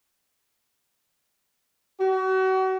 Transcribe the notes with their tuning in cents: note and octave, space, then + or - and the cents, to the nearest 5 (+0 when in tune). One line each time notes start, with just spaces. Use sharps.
F#4 +35